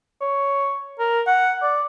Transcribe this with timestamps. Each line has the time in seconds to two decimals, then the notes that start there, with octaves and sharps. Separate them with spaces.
0.21 C#5
0.99 A#4
1.27 F#5
1.62 D5